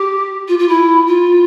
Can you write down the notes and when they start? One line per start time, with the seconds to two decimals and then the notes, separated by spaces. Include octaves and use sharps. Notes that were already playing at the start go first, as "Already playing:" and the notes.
Already playing: G4
0.47 F4
0.58 F4
0.68 E4
1.07 F4